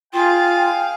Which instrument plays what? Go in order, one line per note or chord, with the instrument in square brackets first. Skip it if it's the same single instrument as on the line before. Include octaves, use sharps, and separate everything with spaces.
[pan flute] F4 [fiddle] G#4 F5 [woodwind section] G5